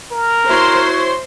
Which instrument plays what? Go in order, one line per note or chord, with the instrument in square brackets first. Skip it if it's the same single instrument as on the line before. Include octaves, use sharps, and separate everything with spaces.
[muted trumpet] A#4
[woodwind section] E4 F#4 C#5 [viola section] C5 C6